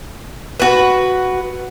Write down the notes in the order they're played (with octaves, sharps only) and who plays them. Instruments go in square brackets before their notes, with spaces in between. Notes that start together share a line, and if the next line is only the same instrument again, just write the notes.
[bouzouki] F#4 B4